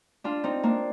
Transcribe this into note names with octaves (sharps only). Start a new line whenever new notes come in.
D4 F4
C4 D#4
A#3 D4